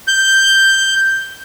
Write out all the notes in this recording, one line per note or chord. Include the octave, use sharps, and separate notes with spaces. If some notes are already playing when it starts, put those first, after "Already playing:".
G6